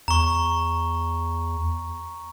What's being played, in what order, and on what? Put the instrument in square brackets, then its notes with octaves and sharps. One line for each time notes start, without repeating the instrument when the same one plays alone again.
[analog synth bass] E2 [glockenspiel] A#5 C#6